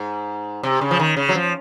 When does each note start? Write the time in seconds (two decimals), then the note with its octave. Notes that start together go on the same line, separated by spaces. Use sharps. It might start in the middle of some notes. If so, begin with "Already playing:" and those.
Already playing: G#2
0.63 C3
0.81 C#3
0.91 F3
0.99 D#3
1.17 C#3
1.29 F#3
1.35 F3